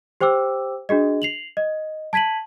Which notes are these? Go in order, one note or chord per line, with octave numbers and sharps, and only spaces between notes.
G4 C5 G5 D6 E6
D4 F#4 G#4 D#5
C7 F7 F#7
D#5
A5 G#6 B6 D#7 F#7